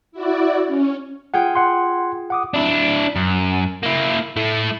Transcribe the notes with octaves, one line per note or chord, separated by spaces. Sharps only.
E4 F#4 D5
C#4
F4 G#4 F#5 G5
F#5 C6
F#5 D6 D#6
D4 E4
F#2
A#3 E4
A3 E4